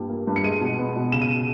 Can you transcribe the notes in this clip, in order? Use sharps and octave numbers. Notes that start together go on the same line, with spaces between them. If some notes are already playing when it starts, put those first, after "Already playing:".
Already playing: G2 A#2 G3
A#3
G2
C#7
G#3 D#7
B2
B3
B2
C#3 E7
D#7